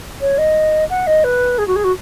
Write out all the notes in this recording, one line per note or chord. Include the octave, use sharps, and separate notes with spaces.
C#5
D#5
F#5
D#5
B4
G#4
F#4
G#4
F#4